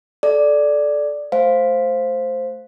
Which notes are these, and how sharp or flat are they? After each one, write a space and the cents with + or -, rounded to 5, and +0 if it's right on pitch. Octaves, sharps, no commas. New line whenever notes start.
A4 -20 D5 +0
A3 -5 C5 +0 F5 +0